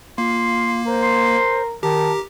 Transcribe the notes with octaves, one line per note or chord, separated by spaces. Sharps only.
A#3 F4 C6
A#4 C5
C6
D#3 G4 A#4 A5